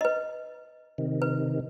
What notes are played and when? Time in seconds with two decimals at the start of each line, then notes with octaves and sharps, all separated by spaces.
0.01 B4 D#5
0.98 C3 D#3
1.22 B4